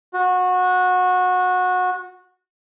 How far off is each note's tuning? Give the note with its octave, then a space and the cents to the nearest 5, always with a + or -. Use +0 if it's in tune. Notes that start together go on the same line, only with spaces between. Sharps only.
F#4 -20